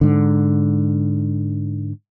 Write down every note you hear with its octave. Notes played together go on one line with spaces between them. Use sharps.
G#2 D3